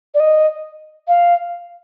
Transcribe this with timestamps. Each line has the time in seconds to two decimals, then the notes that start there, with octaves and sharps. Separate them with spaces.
0.14 D5
0.20 D#5
1.08 F5